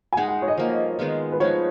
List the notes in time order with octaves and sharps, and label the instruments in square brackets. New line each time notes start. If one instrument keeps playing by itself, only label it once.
[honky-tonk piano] G#5
[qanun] G#3 D#4 G#4 [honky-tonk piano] F#5
[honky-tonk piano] F#5
C#5
D#5
[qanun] F3 A#3 F4
D#3 G#3 B3 F4
[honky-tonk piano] B4
[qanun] F3 G#3 D#4 [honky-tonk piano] C#5